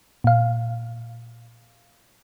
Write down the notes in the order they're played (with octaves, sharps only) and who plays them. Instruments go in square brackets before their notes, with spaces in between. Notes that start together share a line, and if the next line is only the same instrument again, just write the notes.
[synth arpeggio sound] A#2 F5